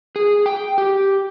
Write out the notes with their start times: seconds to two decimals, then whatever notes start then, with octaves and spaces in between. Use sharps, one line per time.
0.16 G#4
0.46 G5
0.78 G4